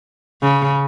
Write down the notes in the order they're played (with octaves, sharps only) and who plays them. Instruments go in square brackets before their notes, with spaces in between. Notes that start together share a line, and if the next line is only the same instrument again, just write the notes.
[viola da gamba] C#3